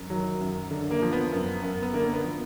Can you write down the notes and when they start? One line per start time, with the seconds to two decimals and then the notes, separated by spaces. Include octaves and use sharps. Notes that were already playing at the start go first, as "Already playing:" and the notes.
Already playing: F#2
0.10 D#3 F#3
0.41 F#2
0.71 D3
0.91 A#3
1.02 F3
1.12 B3
1.32 F#2
1.63 F#2
1.82 B3
1.93 D3 A#3
2.13 B3
2.23 F3